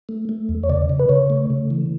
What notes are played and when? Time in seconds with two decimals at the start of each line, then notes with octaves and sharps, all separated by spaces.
0.09 A3
0.29 A3
0.49 E2
0.63 C#5
0.70 C#3 D5
0.89 C#3
0.99 B4
1.09 C#3 C#5
1.30 A3
1.50 C#3
1.70 E3